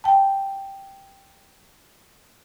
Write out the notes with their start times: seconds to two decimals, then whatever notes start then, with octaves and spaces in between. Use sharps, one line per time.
0.04 G5 A5